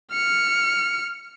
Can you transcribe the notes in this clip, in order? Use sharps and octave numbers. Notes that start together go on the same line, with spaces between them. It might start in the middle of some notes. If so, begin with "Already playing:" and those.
F6 C#7